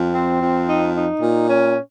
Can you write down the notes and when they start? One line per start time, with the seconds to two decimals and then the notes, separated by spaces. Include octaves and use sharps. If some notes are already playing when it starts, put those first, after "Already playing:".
Already playing: F2
0.12 C4
0.40 F2
0.67 D#4
0.94 D#4
1.21 A#2
1.49 C#4